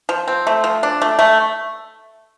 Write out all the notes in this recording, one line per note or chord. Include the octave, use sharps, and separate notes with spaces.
F3
C4
A3
F3
D4
A3
A3